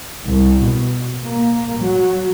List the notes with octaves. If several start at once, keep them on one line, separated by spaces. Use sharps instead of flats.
C2
B2
A#3
F#3